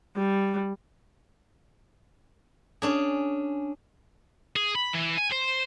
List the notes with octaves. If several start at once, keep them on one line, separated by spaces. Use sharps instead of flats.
G3
C#4 D4 G#4
G#4
B5
E3
G#5
C5